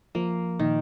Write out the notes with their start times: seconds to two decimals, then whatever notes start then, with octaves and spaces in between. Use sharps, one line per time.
0.15 F3 A#3
0.59 A#2 D#3